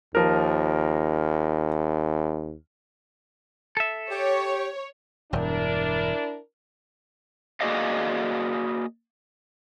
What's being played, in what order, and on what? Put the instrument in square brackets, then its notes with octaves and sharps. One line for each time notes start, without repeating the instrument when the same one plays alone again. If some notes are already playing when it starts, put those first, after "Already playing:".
[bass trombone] D#2 [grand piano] F3 A#4
[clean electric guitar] A4 E5
[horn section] G4 [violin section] C#5
[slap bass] E1 G2 [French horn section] D4 E4 A#4
[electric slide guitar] A#3 F#4 G#4 D5 D#5 F5